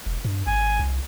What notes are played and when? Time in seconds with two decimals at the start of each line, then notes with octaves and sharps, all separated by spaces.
0.06 E1
0.25 G2
0.47 G#1 G#5
0.79 C2